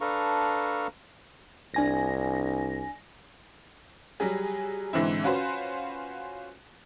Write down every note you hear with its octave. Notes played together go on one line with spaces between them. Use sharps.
D4 A4 B4 F5 A#5 C#6
C2 D4 G#5 A#6
F#3 G3 G#4
G#2 D3 E3 C4 E4
C#4 F4 F#4 B4 C5